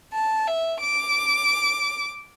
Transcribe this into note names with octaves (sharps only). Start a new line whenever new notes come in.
A5
E5
D6